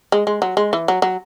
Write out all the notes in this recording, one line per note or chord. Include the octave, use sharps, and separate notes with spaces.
G#3
G#3
F#3
G#3
E3
F#3
F#3